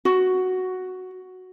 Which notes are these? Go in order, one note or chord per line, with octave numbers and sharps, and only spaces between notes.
F#4